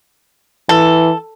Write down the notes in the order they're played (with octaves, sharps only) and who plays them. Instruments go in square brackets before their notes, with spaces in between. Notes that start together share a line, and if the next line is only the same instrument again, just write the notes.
[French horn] E3 [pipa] A4